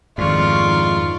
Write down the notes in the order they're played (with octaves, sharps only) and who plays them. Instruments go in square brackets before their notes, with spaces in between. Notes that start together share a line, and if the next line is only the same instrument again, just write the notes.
[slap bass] F2 G#2 [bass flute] D#3 [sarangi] F4 [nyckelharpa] D5 C#6